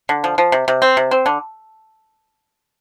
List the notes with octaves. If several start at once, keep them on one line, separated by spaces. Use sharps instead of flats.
D3
F3
F3
C3
C3
C4
C3
C4
D3